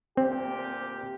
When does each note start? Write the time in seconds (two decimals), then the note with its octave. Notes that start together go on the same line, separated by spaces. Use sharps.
0.17 D2 A#2 C4 G4